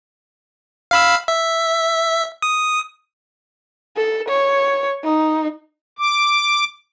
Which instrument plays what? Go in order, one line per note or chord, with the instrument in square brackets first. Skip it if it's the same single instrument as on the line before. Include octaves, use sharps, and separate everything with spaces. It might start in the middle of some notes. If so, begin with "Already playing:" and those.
[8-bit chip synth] F5 B5 E6
E5
D#6
[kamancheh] A4
C#5
D#4
[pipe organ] D6